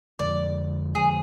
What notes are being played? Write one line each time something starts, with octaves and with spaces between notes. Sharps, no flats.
F2 D3 F3 G#3 D5
F2 D3 F3 G#3 G#4